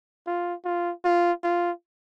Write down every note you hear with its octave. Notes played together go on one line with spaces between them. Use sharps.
F4
F4
F4
F4